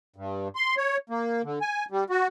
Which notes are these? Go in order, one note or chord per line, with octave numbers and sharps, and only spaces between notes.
G2
C6
C#5
A#3
D3
G#5
G3
F#4